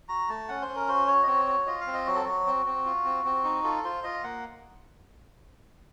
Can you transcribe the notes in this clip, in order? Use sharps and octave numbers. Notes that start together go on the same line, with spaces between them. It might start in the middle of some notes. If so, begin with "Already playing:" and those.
F#4 A#5
A3 A5
C#4 F#5
C5
C#4
A#4
F#4 C5
F#4 C#5
D#5
C4 C#5
F#4
F4 D#5
F5
C4
D#5
F#3 F#4
A4
F#3 F#4
C4
C4
F4
C4
C4
D#4
F4 A4
F4 C5
F4 D#5
A#3 F#5